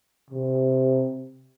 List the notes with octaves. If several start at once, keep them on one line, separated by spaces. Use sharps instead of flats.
C3